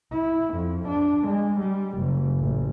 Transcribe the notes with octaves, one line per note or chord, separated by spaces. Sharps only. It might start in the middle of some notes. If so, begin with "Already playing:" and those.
E4
F2
D4
G#3
G3
F#1
A1